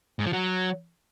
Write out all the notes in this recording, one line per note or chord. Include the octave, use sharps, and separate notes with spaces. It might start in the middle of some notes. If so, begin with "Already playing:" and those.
G#2
F3
F#3